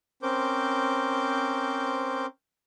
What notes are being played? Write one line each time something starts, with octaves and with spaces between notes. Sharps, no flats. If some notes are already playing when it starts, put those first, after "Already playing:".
C4 C#4 A#4 C5 D6 G6